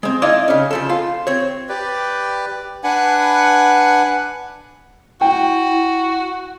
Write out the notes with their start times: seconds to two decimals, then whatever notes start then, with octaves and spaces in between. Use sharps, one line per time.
0.03 G#3 C4
0.22 D#4 E4 D5 D#5 F5
0.48 C#3 C#4
0.71 C#3 F3 A4
0.90 F4
1.27 C4 C#5
1.69 G4 B4 D5
2.84 D4 B4 F#5 G#5
5.21 E4 F#4 G5